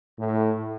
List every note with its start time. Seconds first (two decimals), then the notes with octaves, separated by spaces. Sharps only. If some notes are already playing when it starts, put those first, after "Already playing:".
0.19 A2